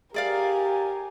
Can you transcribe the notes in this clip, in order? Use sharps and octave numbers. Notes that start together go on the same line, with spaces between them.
G4 G#4 A#4 D5 F5 G#5